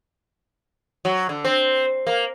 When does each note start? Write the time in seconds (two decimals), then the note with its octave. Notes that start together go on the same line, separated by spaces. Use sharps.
1.05 F#3
1.29 D3
1.45 C4
2.07 A#3